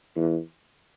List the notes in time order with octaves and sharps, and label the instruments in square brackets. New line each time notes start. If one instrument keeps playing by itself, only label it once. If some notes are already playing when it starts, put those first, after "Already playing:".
[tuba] E2